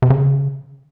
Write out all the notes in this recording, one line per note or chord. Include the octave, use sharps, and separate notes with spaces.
C3
C#3